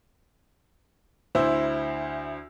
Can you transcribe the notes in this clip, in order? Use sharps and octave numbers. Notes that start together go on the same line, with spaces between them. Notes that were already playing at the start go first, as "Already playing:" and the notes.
D2 E4 C5 E6